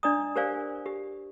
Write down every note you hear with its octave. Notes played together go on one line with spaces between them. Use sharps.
D4 D5 D#5 A#5 D#6
G4 A#4 C5 D5 F5 G#5
G4